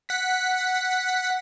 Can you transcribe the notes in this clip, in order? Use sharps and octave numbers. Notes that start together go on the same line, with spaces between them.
F#5 B6